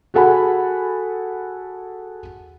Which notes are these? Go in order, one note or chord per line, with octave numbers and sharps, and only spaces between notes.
F#4 G#4 A4 F#5 G#5 B5